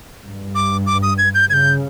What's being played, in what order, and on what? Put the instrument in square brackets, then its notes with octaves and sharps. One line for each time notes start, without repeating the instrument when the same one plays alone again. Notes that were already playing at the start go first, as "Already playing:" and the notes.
[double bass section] G2
[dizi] D6
D6
D#6
G#6
G6
[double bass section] C#3 [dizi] G#6
[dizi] G6